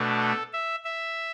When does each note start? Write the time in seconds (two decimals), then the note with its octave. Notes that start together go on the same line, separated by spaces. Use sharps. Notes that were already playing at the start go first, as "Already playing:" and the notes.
Already playing: B2 A3 D4
0.20 A4
0.53 E5
0.84 E5